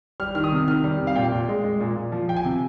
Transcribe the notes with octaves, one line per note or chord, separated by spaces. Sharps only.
G3 F6
D#3 F6
D#6
C3
D#3 F6
G3
C3
F5
A#2 G5
A#2
G#3
G#3
A#2
A#2
F3
F3 G5
G#5
C3